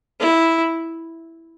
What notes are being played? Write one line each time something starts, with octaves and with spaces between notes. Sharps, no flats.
E4